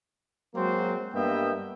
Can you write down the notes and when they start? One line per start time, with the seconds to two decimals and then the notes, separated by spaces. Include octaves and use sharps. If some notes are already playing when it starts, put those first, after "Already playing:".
0.55 F#3 G#3 A#3 C4 F#4 C5
1.13 G2 A#3 B3 D#5 E5 G5